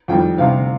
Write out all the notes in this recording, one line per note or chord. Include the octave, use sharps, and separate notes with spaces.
F2 D#3 G3 G5
D2 C3 G3 F5